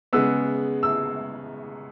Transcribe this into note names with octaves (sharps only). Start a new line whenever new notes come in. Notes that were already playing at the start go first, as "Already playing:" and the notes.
C#3 G#3 B3 E6
E6